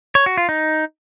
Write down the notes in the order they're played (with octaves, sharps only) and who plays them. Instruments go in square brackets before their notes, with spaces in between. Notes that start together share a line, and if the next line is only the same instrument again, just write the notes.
[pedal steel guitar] C#5
F#4
F4
D#4